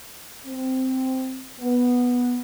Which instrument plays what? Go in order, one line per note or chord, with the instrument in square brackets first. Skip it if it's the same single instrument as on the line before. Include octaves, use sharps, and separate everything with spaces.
[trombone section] C4
B3